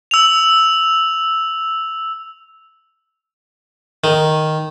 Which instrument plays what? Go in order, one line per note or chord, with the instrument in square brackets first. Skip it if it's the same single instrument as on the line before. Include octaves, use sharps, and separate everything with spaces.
[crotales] E6 F7
[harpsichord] D#3